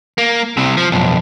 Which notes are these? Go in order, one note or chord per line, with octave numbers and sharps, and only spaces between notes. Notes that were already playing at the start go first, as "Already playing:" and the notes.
A#3
C2 C3
F3
B1 F2